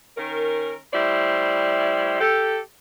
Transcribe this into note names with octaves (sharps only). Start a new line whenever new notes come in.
D#3 C#4 A#4
G3 A3 E4 C5 D5
G4 A4